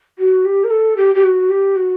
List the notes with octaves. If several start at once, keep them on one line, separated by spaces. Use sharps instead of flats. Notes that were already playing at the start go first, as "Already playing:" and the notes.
F#4
G4
A#4
A4
G4
G4
F#4
G4
F#4